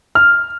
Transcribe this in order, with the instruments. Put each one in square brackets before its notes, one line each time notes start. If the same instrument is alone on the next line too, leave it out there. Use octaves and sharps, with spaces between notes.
[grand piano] F6